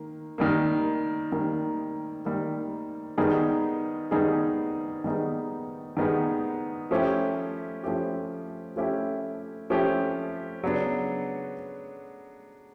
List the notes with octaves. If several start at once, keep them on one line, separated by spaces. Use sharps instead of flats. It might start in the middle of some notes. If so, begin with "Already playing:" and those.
Already playing: D#3 A#3
D#3 G3 A#3
D#3 G3 A#3
D#3 G3 A#3
D#3 G3 B3 D#4 G#4
D#3 G3 B3 D#4 G#4
D#3 G3 B3 D#4 G#4
D#3 G3 B3 D#4 G#4
F3 A3 C#4 E4 G4
F3 A3 C#4 E4 G4
F3 A3 C#4 E4 G4
F3 A3 C#4 E4 G4
C#3 F#3 B3 D4